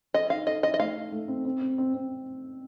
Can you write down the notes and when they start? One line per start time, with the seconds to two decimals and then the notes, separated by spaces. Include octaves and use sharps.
0.14 A4 D#5
0.30 D#4 F5
0.47 A4 D#5
0.63 D#4 D#5
0.74 D#5
0.79 A3 F5
0.96 D#4
1.12 A3
1.28 C4
1.45 C4
1.61 C4
1.78 C4
1.94 C4